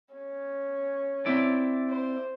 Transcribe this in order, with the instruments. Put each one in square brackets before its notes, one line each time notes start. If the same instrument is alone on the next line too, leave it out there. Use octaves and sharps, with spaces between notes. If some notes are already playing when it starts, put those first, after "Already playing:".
[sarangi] C#4
[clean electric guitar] C4 E4 D5
[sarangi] C5